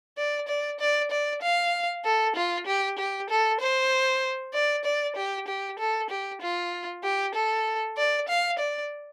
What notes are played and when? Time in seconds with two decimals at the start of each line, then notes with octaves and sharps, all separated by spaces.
0.18 D5
0.48 D5
0.80 D5
1.11 D5
1.43 F5
2.05 A4
2.36 F4
2.67 G4
2.99 G4
3.30 A4
3.60 C5
4.54 D5
4.85 D5
5.16 G4
5.48 G4
5.79 A4
6.10 G4
6.42 F4
7.04 G4
7.35 A4
7.98 D5
8.29 F5
8.59 D5